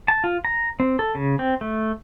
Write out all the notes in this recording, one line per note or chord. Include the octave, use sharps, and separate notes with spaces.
A5
F4
A#5
C4
A4
C#3
C4
A3